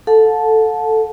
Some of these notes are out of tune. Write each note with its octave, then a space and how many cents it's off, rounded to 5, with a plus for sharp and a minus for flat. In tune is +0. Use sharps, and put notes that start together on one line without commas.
A4 +0 F#5 -40 A5 -15